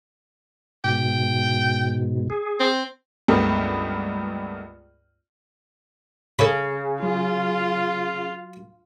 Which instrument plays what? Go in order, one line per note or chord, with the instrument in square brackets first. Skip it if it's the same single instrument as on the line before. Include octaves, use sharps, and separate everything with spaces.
[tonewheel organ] G#2 B2 [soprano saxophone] G5
[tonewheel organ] G#4
[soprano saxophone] C4
[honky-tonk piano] C#2 G2 A3 B3 G4 A#4
[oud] C#3 [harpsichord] A4 C#5 B5
[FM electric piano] F#3 [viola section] F4